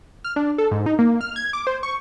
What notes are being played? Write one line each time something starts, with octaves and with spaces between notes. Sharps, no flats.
F6
D4
A4
G#2
D#4
A#3
F6
G#6
D6
C5
C#6